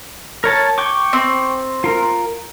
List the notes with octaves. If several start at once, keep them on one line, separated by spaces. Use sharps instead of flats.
A#4 C#5 A5
G5 C#6 D6
C4
F4 A#4